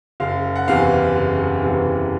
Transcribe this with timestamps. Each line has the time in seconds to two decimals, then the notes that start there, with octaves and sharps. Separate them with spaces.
0.20 F#1 F5
0.56 F#5
0.68 E2 C3 E3 F5
1.15 F#1
1.62 E2 C3 E3